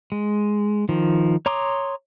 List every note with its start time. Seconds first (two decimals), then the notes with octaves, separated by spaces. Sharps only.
0.12 G#3
0.89 D#3 F3
1.46 C#5 A#5 C6 D6 D#6